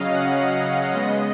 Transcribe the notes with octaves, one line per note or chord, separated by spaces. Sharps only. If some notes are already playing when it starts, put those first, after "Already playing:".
Already playing: C#3 F#3 C#4 D#5 F5
F#5
C#3 G#3 B3 D#5